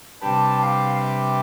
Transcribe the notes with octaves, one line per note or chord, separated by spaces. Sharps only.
C3 G3 D4 G4 B4 A5
F5
E5